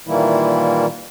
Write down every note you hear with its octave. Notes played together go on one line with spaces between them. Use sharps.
A#2 D#3 E3 G3 A#3 E4